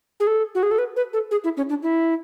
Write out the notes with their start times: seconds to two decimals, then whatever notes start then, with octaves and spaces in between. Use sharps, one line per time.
0.20 G#4
0.27 A4
0.55 F#4
0.63 G#4
0.71 A4
0.78 B4
0.96 B4
1.13 A4
1.31 G#4
1.44 E4
1.57 C#4
1.69 D4
1.83 E4